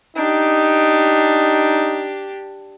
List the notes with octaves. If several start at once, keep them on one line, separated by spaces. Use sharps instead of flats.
D4 D#4 G4